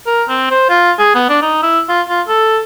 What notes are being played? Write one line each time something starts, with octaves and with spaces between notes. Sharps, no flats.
A#4
C4
C5
F4
G#4
B3
D4
D#4
E4
F4
F4
A4